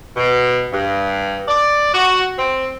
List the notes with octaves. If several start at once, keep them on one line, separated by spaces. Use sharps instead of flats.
B2
G2
D5
F#4
C4